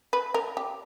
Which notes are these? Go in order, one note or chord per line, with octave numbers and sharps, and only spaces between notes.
B4
A#4
G4